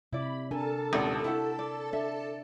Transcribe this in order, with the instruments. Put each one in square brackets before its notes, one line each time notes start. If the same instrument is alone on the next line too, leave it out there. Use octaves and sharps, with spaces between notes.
[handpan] C3 [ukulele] E4 D5 [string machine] B5
[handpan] D4 A#4 [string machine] A4 A5 [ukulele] G#5
[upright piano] D#1 G#1 [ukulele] C#4
[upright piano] E4 [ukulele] F#4 G4 F#5
[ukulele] D5
[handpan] D4 D5 [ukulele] E5